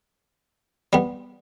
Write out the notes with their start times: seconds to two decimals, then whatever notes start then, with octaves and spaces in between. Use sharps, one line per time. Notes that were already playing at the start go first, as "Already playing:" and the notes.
0.93 G3 B3